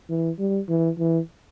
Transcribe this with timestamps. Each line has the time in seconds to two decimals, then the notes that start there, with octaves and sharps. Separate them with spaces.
0.09 E3
0.39 G3
0.69 E3
0.98 E3